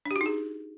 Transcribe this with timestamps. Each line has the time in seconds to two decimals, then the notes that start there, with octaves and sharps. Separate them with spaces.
0.05 D4
0.11 G4
0.16 F#4
0.21 D#4
0.26 G#4